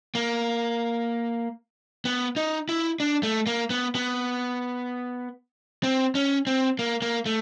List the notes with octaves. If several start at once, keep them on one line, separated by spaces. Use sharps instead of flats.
A#3
B3
D#4
E4
D4
A3
A#3
B3
B3
C4
C#4
C4
A#3
A#3
A3